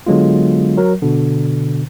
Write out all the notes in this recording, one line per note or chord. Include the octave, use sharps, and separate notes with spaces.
D3 F#3 G#3 B3 F4
F#3 A#4
B2 D3